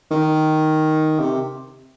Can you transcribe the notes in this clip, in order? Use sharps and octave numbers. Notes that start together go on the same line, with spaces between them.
D#3
C3